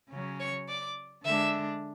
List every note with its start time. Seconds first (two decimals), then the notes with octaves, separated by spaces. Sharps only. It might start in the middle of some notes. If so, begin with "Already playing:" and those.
0.10 C#3 F#3 C#4
0.39 C#5 C#6
0.68 D5 D6
1.24 D3 G#3 D4 E5 E6